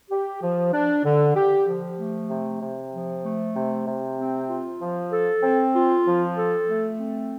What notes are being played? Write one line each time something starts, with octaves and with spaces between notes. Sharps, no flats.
G4
F3
D4
D3
G4
F3
A3
C3
C3
F3
A3
C3
C3
C4
F4
F3
A4
C4
F4
F3
A4
A3
C4